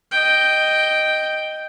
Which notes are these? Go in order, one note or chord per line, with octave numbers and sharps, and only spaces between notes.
D#5 G5